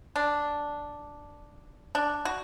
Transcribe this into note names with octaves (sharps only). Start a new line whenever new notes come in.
D4
D4
F#4